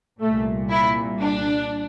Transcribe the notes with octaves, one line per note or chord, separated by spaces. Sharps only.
C2 A#2 A3
E4
D4